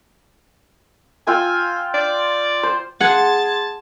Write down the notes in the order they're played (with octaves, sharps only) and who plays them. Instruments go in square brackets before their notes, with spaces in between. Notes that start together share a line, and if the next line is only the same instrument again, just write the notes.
[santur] F4 G5 E6 [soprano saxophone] G#5
[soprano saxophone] D5
[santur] C5
[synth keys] G#4 C6 G#6 [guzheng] F#5 [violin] A5 A6